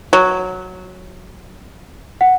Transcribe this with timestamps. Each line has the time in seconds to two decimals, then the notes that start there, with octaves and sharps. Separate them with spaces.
0.13 F#3
2.21 F#5